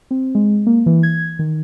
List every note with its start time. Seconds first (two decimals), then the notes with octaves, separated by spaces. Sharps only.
0.11 C4
0.35 G#3
0.67 A#3
0.86 E3
1.03 G#6
1.39 D#3